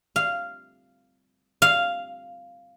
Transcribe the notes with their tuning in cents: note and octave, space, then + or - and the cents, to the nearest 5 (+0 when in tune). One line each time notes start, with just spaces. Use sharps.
F5 -10
F5 -5